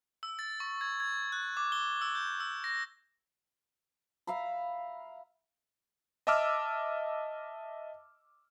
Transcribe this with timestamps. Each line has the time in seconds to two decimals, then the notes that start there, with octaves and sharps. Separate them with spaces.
0.23 E6
0.39 A6
0.60 C#6
0.81 G#6
1.00 G#6
1.32 F#6
1.57 D6
1.72 G7
2.01 E6
2.15 G6
2.40 E6
2.64 A#6
4.27 E5 F5 A#5 B5
6.27 D#5 E5 A5 D6 E6 F6